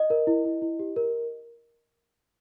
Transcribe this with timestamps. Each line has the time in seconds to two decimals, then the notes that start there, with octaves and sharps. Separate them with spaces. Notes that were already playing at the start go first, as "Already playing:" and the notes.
Already playing: D#5
0.10 A#4
0.27 E4
0.45 E4
0.62 E4
0.79 G4
0.96 A#4